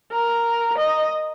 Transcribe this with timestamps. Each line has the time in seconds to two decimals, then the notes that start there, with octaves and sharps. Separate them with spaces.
0.12 A#4
0.78 D#5